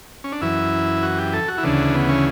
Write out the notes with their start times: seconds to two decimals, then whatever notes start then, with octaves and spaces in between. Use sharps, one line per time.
0.24 C#4
0.32 D4
0.42 F#2 E3 E4
1.03 F#4
1.18 G4
1.33 A4
1.48 F#4
1.58 E4
1.63 D2 C#3 E3 D4
1.94 B3
2.09 C#4